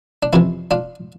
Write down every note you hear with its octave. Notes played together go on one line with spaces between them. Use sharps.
D4
F2 C3 E3 C4 E4
D4 F4